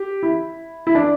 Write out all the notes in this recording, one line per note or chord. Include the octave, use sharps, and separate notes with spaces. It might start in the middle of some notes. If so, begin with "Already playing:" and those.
Already playing: G4
E4
E4
D4